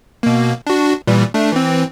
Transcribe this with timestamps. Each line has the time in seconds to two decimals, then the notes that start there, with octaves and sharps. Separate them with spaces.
0.23 B2 A#3
0.67 D4 F#4
1.07 A#2 E3 G3
1.34 A3 D4
1.52 E3 C4